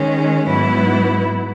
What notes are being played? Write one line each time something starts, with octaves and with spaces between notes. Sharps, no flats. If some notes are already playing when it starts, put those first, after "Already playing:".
Already playing: D#3 G#3 C#4
G#2 F#3 B3 E4